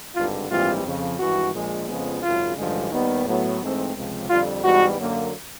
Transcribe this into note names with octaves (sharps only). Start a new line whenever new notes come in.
G#1 G2 D3 F4
A#1 G#2 E3 G3 C4 F4
F2 C#3 F3
G#1 G2 E3 F#4
A#1 A#2 F3 G#3
F2 C#3 F3 G#3 B3
G#1 F#2 C#3 F4
A1 G2 D3 F3 G#3
D#2 D#3 G3 B3
A2 F#3 B3
G#2 E3 A3 C4
C#2 C3 F3
F2 D3 G3 F4
G#2 E3 G3 B3 F#4
F#2 D3 F#3 A#3